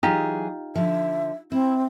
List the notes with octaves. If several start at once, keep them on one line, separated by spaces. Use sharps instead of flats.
E3 F#3 D#4 F4 G4 G#4
D3 F3 E5
C4 E4